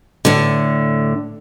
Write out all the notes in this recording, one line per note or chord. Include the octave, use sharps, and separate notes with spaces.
A2 D3